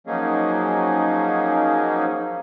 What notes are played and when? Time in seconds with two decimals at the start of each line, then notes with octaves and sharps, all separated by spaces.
0.07 F3 F#3 A#3 C#4 D#4 G#4